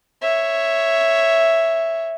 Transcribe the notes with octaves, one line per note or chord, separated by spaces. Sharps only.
C#5 E5